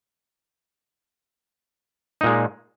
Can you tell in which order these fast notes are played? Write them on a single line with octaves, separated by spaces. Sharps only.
D#4 A#2 G#3